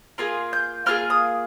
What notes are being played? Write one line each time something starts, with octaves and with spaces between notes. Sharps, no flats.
A#3 F4 G#4
G6
A#3 F4 G#4 F6
D#6